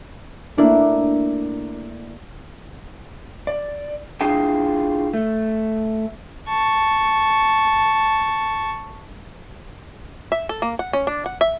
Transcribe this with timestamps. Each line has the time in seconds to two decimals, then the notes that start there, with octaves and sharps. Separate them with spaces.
0.57 A3 A#3 D4 E4
3.47 D5
4.21 D4 E4 F4 G#4 G5
5.13 A3
6.49 A5 C#6
10.32 E5
10.49 A4
10.62 A#3
10.79 F#5
10.93 C#4
11.07 D4
11.26 F#5
11.41 E5